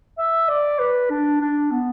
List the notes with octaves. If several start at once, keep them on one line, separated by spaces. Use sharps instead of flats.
E5
D5
B4
D4
D4
B3